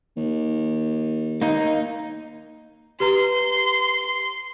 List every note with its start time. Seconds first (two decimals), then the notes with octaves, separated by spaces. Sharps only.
0.16 D#2
1.42 A#3 D#4
3.00 G4 B4 A#5 C6